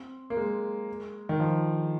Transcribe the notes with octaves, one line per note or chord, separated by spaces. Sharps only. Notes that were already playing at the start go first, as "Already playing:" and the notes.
Already playing: C4
A#3
G#3
D#3
F3